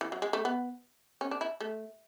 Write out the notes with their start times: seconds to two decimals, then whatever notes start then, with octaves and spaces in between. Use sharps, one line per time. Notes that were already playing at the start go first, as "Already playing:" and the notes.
0.01 E3
0.12 F#3
0.22 G#3
0.33 A3
0.45 B3
1.21 C#4
1.31 D4
1.41 E4
1.60 A3